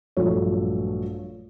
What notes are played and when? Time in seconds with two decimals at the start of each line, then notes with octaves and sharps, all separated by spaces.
0.17 A#1 G2 F#3 A3 C#5